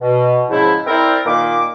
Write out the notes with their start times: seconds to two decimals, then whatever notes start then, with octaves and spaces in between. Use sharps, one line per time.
0.02 B2
0.50 G#2 C#3 F3 E4
0.87 C4 E4 A#4 C5 D5
1.26 A#2 D#3 A#3 D6